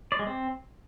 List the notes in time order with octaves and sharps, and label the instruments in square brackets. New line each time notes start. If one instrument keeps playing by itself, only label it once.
[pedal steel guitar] D5
G#3
C4